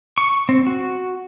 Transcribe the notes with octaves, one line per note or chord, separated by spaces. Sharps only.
C#6
C4
F#4